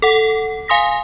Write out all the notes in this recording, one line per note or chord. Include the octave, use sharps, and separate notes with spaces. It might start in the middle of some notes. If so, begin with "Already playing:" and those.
A4 F#5
F5 G#5 C6 D#6 A#6 B6